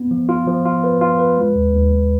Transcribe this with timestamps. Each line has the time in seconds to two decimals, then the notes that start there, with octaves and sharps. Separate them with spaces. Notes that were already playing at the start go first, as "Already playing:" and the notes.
Already playing: B3
0.11 F3
0.29 F4
0.47 F3
0.65 F4
0.84 B4
1.01 F4
1.19 B4
1.38 G#3
1.55 D#2
1.74 D#2
1.92 D#2